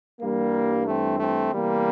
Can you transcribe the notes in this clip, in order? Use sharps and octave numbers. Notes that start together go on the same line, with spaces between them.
G2 E3 G3 A#3
A3 C4
A3 C4
E2 C3 E3 G3 A#3